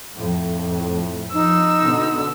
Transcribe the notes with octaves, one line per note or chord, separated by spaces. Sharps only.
F2 A2
F3 D#4 E6
B2 D3 B3